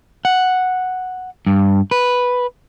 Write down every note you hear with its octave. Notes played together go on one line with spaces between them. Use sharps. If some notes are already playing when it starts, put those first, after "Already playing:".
F#5
G2
B4